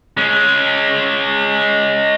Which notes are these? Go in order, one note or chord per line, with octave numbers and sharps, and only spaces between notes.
G#3 C#4